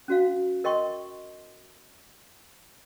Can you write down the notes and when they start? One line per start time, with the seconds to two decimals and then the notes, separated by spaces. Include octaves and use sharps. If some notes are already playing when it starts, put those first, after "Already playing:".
0.08 C#4 F#4 F5
0.64 A#4 D#5 G5 C6 C#6